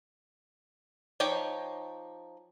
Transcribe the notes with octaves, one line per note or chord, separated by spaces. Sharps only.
F3 D#4 G4 C#5 G5